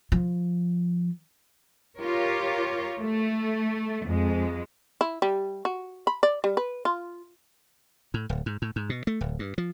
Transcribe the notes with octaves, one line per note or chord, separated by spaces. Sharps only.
F3
F4 G4 A#4 C#5
A3
F2 G#3
E4
G3
F#4
B5
D5
G3
B4
F4
A2
D1
G#2
A2
G#2
B2
A3
D1
G2
F3